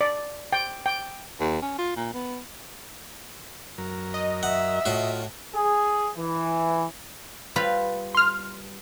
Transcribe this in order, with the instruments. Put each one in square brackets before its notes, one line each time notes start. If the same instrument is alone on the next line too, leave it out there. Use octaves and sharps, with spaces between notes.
[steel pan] D5
G5
G5
[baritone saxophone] D#2
C#4
F4
A#2
B3
[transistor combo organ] F#2 F#3 A#4
[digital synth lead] D#5
[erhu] E5 [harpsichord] F#5
[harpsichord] A2 F#4 [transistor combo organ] F4
[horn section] G#4
E3
[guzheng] G3 F4 B4
[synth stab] C6 F6